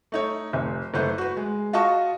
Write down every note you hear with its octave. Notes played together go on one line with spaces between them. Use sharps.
A3 D#4 C#5
F1
F#1 A3 B4 C5
F#4 B4
G#3
F4 F#4 D#5 A5 C#6